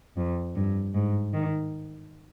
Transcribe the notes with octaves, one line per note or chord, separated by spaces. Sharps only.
F2
G2
G#2
D#3